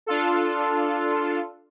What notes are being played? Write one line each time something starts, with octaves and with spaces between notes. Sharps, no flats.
D4 F4 A4